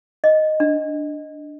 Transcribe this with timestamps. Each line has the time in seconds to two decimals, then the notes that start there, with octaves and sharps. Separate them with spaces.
0.24 D#5
0.60 D4